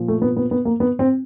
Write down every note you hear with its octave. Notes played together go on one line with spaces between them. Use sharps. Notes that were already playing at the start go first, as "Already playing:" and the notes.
Already playing: A#2 F3
A3
B3
B3
B3
A#3
B3
C4